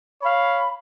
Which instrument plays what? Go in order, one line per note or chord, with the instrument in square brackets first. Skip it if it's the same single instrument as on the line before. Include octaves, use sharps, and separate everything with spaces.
[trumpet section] C#5 F5 [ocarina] B5